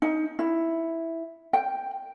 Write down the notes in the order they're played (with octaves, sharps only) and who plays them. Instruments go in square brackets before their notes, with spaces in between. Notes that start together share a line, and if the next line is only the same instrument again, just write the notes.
[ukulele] D#4
E4
G5